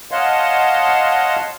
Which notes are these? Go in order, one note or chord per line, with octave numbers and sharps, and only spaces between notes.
C#5 D#5 F5 F#5 A5 C6